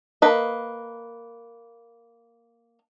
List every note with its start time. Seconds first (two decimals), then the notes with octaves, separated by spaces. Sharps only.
0.22 A#3 B4 D#5